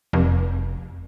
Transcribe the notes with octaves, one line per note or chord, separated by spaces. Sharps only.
F1